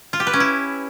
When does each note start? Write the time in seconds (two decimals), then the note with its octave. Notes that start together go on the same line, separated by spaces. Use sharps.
0.13 F4
0.20 G4
0.27 B4
0.33 C#4
0.40 E4